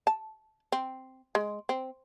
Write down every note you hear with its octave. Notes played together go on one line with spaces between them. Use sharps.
A5
C4
G#3
C4